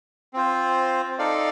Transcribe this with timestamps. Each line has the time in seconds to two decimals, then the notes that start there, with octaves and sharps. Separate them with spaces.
0.33 C4 F4 C5
1.18 D#4 A4 D5 F5